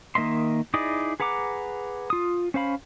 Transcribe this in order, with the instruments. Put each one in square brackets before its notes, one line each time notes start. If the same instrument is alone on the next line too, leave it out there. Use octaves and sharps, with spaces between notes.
[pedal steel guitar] D#3 A#3 D#5 E5 C6
D#4 E4 G#4 D5 D#5
G#4 B4 F#5 A#5 D6
F4 D#6
C#4 C5 F5 B5